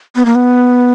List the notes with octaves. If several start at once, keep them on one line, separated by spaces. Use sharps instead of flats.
B3
A#3
B3